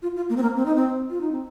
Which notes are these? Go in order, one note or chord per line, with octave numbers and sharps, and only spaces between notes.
F4
F4
A#3
C4
A#3
C4
D#4
C4
F4
D#4
C4